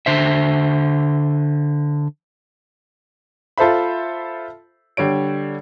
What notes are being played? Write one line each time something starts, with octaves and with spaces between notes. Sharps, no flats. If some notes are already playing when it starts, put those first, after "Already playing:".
D3 C5 E5
F4 A4 C5 E5 B5
D3 G3 C#5 D7